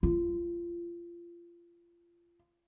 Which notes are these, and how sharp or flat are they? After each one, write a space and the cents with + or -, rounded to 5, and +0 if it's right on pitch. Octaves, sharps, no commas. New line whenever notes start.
F4 -25